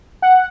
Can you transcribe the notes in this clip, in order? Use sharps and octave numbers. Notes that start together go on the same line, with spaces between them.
F#5